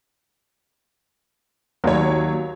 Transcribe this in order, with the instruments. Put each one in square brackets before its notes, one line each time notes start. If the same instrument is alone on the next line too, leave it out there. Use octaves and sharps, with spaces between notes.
[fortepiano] D#2 [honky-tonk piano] F#3 C#5